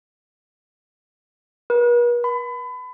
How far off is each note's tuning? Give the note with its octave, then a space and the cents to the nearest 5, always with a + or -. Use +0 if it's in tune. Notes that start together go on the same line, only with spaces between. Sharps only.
B4 -45
B5 +30